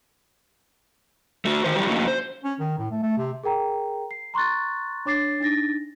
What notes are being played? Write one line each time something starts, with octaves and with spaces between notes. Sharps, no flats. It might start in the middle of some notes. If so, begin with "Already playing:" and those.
A3 F#4
D#3 C5
F#3 G3 E4 G4
F3 A3 A#3 C#4 D#4 F#4
C5
C#4
D#3
A2
A3
A3
C3
G#4 A#4 G5 A#5
C7
A#5 C6 C#6 F#6 A6
D4 C#5 D6 A6 C7
D4 D#4 A6 A#6